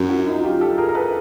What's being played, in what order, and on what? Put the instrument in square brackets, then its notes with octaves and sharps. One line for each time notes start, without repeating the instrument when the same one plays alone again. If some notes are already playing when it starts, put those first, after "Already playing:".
Already playing: [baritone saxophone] F#2
[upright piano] E4 F#4
D#4 F4
F4 G4
G4 A4
G#4 A#4
A#4
A4 B4